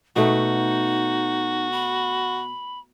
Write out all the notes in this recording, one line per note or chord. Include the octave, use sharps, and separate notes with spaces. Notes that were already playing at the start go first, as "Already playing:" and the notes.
B2 A3 D#4 F#4
B5